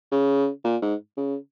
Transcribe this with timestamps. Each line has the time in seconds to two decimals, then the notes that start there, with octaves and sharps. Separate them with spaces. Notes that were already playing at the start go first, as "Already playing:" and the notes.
0.12 C#3
0.65 A#2
0.82 G#2
1.17 C#3